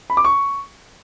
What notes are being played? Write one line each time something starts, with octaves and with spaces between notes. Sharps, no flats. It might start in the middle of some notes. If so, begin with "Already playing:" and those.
B5
D6
C#6